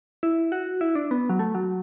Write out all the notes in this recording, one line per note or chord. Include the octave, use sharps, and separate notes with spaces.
E4
F#4
E4
D4
B3
F#3
A3
F#3